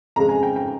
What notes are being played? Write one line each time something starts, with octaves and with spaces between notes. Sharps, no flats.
F2 C#3 G#3 A#5
G#5
G5
G5